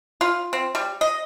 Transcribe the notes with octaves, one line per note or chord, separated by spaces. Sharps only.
F4
C4
G3
D#5